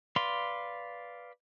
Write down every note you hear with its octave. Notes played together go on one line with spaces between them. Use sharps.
B4 D5 F5 C6